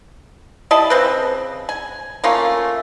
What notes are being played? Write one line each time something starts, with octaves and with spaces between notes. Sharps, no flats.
G3 E4 D#5 A5
C#3 C4 B4
G#5
A3 A#3 C#4 F4